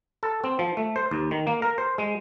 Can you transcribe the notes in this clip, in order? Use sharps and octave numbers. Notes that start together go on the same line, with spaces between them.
A4
C4
F3
A3
C5
D#2
D#3
A#3
A#4
C5
G#3